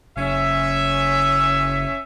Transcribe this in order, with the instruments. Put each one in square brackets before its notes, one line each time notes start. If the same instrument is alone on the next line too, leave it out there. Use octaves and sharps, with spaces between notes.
[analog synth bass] F#1 [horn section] C#4 E5